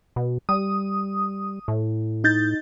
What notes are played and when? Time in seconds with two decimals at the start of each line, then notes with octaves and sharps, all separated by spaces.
0.16 B2
0.49 G3 D#6
1.68 A2
2.24 D#4 G6 A6